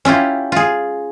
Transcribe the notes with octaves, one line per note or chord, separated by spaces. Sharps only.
C#4 E4 F4 G4
F4 G#4